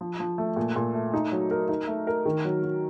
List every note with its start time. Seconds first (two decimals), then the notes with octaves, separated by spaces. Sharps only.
0.01 F3
0.20 F3
0.38 A3
0.56 A#2
0.76 A#2
0.94 A3
1.14 D#4
1.32 F#3
1.51 A#4
1.69 D#4
1.87 A3
2.07 A#4
2.25 D#3
2.45 F#3
2.63 F#3